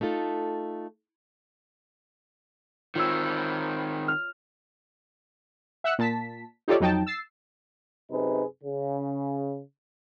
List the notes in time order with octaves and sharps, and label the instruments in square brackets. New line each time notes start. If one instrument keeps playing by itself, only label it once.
[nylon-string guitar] A3 D#4 F4 A4
[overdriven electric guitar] D#3 C4 [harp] F4 C#5 E6
[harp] F6
[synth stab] E5 F#5 E6 F#6 C#7
A#2 A5 B6
D#4 F4 G4 A4 C#5 D5
F2 F#3 D#4 G5 A5
E6 A6 C7
[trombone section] F#2 C3 D#4 G#4 B4
C#3